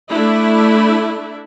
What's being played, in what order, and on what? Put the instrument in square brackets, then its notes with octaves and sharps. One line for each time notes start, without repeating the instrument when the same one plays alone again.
[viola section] A3 D4 E4